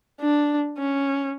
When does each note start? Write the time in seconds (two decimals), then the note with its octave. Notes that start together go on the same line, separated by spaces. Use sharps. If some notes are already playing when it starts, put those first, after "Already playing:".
0.20 D4
0.78 C#4